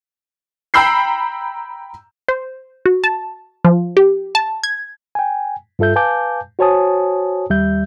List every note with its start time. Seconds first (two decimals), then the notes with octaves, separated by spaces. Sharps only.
0.74 G5 A#5 B5 E6 G6 C7
2.28 C5
2.86 F#4
3.04 A5
3.65 F3
3.97 G4
4.35 A5
4.64 G#6
5.15 G5 G#5
5.79 G2 F4 A4 E5 G6
5.95 B4 F5 G#5 A5 D6 G6
6.59 F#4 C5 C#5 G#5 A5 D#6
7.50 D#2 G3 E5 G6